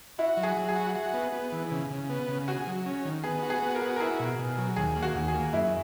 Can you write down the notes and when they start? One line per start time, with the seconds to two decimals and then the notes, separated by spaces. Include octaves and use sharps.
0.18 E4 F#4
0.37 F#3
0.43 G#4
0.57 F#3
0.69 G#4
0.75 F#4
0.95 F#4
1.14 B3
1.32 B3
1.52 E3
1.71 C#3
1.90 C#3
2.10 B3
2.28 C#3
2.47 F#4 G#4
2.67 F#3
2.86 C#4
3.05 D#3
3.24 B3 G#4
3.42 F#4
3.50 G#4
3.62 B3
3.75 A#4
3.81 F#4
3.96 A#4
4.00 E4 G#4
4.19 B2
4.39 B2
4.58 F#3
4.76 D#2 G#4
4.96 A#3
5.03 F#4
5.15 D#2
5.28 G#4
5.34 A#3
5.53 F#2 E4